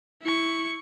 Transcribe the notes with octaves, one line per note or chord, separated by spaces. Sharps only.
E4 C#6